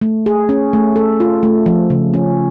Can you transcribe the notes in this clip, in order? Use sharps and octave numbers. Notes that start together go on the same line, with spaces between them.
A3
G#4
C#4
A3
A4
F4
A3
F3
C#3
C#4